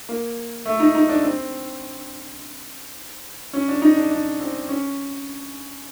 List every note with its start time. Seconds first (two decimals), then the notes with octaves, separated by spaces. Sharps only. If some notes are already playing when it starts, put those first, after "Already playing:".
0.09 A#3
0.66 A3
0.80 D#4
0.95 D#4
1.09 D4
1.23 C4
3.53 C#4
3.68 D4
3.82 D#4
3.97 D4
4.11 D4
4.40 C4
4.69 C#4